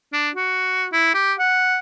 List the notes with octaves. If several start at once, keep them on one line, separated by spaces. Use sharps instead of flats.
D4
F#4
E4
G4
F#5